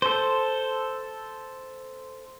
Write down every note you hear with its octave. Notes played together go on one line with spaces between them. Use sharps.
A4 C5